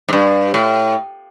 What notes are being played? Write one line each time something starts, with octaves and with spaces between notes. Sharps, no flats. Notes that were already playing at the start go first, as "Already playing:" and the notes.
G#2
G2
A2